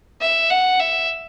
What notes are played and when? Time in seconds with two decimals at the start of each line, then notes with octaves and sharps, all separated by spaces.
0.21 E5
0.50 F#5
0.80 E5